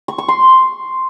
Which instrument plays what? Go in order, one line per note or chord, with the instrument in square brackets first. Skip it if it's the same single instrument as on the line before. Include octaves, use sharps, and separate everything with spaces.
[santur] C#6
C#6
C6